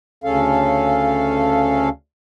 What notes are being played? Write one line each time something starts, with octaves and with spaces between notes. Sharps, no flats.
D2 C#3 C#4 A4 F5